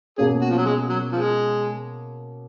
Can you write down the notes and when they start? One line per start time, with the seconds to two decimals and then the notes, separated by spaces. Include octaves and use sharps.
0.18 B2 A#3 C#4 G#4
0.42 F#4
0.51 F3
0.58 F#3
0.65 G#3
0.89 F#3
1.12 F3 G#3